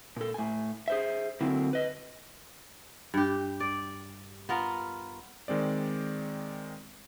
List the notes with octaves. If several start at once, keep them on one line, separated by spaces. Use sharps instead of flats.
A#2 A4
A2 G#5
G#4 C5 E5
D3 F#3 A#3 C4 E4
B4 D#5
G2 G4
D5
B3 F4 A#4
D#3 G#3 C4 D5